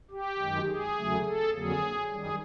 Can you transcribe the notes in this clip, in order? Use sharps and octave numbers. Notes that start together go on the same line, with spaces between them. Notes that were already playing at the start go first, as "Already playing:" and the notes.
G4
F#2 D#3 G#3
G#4
E2 C#3 F#3 A3
A4
F2 D3 F#3 A#3 G#4
F#2 D#3 G3 G#4